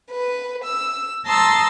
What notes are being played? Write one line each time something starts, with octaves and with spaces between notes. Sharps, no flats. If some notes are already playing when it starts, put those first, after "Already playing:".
B4
E6
A5 A#5 C6 D#6 E6 A6